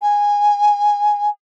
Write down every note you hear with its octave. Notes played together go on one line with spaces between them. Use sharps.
G#5